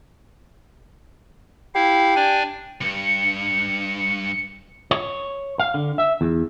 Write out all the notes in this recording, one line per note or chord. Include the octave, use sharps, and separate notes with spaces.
E4 G4 F5
D4 D5 G#5
C#2 G2 C#7
C#5
F5
D3
E5
E2